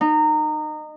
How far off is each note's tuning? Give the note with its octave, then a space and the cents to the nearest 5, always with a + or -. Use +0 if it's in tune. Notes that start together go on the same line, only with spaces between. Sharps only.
D#4 -25